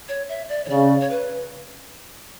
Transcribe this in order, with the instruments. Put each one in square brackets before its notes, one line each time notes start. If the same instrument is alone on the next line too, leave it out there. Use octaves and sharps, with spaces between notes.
[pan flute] C#5
E5
D5
C#5
[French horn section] C#3 [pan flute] D5
[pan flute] C#5
B4